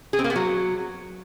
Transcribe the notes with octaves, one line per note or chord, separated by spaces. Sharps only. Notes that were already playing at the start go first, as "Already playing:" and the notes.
G#4
C4
A#3
B3
F#3